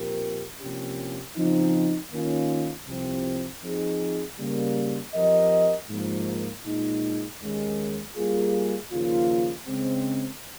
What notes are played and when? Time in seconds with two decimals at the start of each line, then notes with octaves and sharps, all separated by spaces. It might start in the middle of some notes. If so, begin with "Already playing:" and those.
Already playing: A#2 F3 C4 G4 A#4
0.60 C3 F3 A#3 C#4 G4
1.36 C#3 F3 C4 D#4
2.11 D#3 A#3 C#4 F4
2.86 C2 C3 F3 C4
3.62 F3 C4 D#4 G#4
4.38 C#3 G3 A#3
5.13 F3 C4 G4 A#4 D#5
5.88 G#2 F3 A#3
6.64 A#2 G#3 D#4
7.40 D#2 D#3 G#3 C#4
8.16 G3 A#3 F4 G#4
8.91 D#2 C#3 F3 A#3 F4
9.67 C#3 G#3 C4